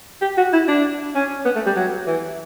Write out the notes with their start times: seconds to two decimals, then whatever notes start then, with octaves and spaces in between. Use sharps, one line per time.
0.22 G4
0.37 F#4
0.53 E4
0.68 D4
1.15 C#4
1.45 B3
1.56 A3
1.66 G3
1.76 F#3
2.07 E3